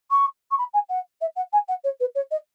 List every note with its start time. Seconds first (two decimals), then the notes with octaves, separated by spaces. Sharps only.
0.10 C#6
0.51 C#6
0.58 B5
0.73 G#5
0.89 F#5
1.21 E5
1.35 F#5
1.52 G#5
1.68 F#5
1.84 C#5
2.00 B4
2.15 C#5
2.31 D#5